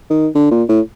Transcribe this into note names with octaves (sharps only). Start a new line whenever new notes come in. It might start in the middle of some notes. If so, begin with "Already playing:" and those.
D#3
D3
A#2
A2